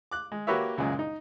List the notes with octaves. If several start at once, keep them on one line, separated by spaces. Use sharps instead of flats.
D6 F#6
G#3
A#3 F#4 G4 B4 C#5 E5
C#2 F#2 A#2 G#3
D#4